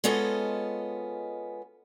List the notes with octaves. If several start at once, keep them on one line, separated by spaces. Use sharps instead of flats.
G#3 B3 C#4 F4 A4 D#5